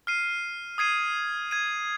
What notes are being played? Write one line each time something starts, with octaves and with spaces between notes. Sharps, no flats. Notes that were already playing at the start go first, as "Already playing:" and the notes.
F6 C7 D#7
D#6 G#6 C7 D#7
G#6 D#7